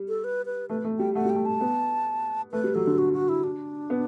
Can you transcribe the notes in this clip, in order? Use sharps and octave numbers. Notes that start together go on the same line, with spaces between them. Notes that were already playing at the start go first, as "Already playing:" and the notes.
Already playing: G3
A4
B4
B4
A3 B4
A3
G3 G5
A3 F#5
G3 G5
A3
A5
B3
A3 B4
G3
F#3 A4
D3
F#4
F#4
E4
D4
B3